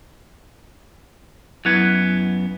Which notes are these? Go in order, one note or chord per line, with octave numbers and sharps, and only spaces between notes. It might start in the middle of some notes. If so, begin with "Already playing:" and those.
F#2 B3 E4 F#6 G#6